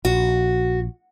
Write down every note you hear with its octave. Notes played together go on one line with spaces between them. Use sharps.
A#1 F#4